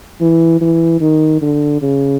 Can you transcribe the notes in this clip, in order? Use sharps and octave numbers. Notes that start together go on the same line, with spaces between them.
E3
E3
D#3
D3
C#3